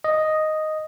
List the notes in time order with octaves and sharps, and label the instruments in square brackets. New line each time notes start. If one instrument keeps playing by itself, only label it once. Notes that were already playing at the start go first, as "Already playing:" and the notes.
[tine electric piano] D#5